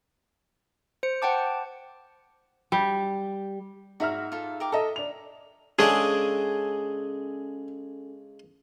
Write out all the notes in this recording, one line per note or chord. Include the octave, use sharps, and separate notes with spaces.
C5 C#7
C5 F#5 G5 A5 D6
G3
G#2 F#4 E5 A#5 F6
F4 A4
A#4 G5 D6
A4 D#5 E5 A#5
D4 F7
C#3 G#3 C#4 D4 G#4 A4